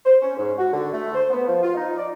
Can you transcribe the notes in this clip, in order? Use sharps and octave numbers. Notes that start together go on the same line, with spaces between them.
C5
C#4
G#2
F#4
D3
A3
C5
B3
F3
F4
D#4
D5